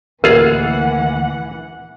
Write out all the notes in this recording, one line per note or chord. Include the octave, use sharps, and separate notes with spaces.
A1 D2 A#2 E3 F4 G#4 A#4 F#5